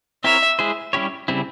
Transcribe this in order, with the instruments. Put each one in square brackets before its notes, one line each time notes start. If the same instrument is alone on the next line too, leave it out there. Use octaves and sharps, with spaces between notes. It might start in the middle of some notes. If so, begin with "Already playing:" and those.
[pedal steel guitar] C4 E4 A#4 C#5 [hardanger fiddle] E5
[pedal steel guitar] G#3 E4 G#4 C5
G3 C#4 E4 G4 C#5
C#3 G3 C4 E4